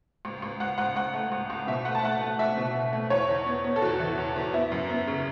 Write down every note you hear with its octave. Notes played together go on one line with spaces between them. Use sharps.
C#2
C#2
C#2 F#5
C#2 F#5
C#2 F#5
A3
C#2
C#2
B2 E5
A3 F#5
A5
A3 F#5
A3
A3 E5
B2
B2
A3
E2 C#5
E2
B3
B3
A4
E2 F#4
E3
E2
E2
B3 E4
F#2
B3
C#3